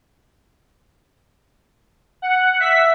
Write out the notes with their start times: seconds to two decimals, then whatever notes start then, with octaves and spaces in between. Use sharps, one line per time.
2.22 F#5
2.60 E5 B6